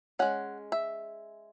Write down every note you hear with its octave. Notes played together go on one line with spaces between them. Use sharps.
G#3 C#4 F#5
E5